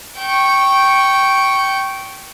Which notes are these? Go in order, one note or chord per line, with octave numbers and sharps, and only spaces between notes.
G5 C#6